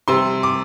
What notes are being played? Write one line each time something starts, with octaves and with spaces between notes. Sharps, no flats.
C3 G3 C6
D6